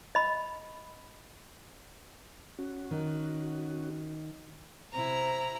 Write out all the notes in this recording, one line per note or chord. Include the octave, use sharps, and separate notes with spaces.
D#5 B5
C#4 F#4
D#3
C3 C4 E4 A#5